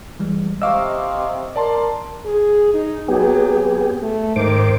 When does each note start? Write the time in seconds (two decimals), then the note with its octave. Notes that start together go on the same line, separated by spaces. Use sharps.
0.20 E3 G3 G#3
0.62 C3 D#5 F5 C#6 D6 E6
1.56 A#4 D5 A5 C6
2.25 G#4
2.74 D#4
3.08 F#3 B3 G4 G#4
4.02 A3
4.36 G#2 D#3 C5 D6